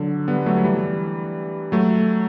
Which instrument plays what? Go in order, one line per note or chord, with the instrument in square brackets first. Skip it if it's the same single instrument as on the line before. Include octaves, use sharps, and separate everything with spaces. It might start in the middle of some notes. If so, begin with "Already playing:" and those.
Already playing: [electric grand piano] D3 F#3
G3 B3
F#3 A3
F#3
E3 G3
F#3 A3